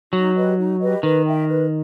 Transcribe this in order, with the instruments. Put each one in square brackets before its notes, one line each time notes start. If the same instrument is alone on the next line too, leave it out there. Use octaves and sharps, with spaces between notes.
[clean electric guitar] F#3 [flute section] D#4
[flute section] G4 B4 D#5
D#4
G4 B4 D#5
[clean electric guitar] D#3 [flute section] B4
[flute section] E5 G5
B4